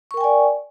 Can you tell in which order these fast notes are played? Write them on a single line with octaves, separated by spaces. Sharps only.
C#6 A#4 G5 G#5 D5